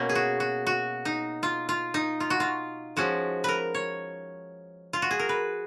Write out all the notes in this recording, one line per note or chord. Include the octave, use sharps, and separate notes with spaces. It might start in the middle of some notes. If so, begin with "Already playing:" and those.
Already playing: B2 A#3 C#4
G#4
F#4
F#4
F#4
D#4
F4
F4
D#4
F4
F#4
F4
F3 G#3 C#4 F#4
A#4 B4
C#5
F4
F#4
G#4
A#4
B4